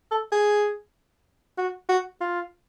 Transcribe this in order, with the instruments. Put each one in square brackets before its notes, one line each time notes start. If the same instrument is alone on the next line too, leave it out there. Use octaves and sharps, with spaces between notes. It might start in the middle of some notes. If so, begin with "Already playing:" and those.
[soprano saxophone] A4
G#4
F#4
F#4
F4